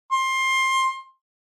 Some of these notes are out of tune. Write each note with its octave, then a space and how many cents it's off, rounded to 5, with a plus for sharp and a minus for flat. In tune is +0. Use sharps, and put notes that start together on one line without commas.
C6 +20